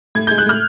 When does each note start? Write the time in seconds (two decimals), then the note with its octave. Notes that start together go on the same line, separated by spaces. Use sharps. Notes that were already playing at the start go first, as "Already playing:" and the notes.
0.15 A2 G#6
0.27 G6
0.31 G#3
0.38 F#6
0.46 A2 F6